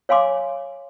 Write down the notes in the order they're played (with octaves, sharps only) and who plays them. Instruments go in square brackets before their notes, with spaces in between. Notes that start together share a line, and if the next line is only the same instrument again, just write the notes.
[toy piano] C#5 F5 G#5 C6 D6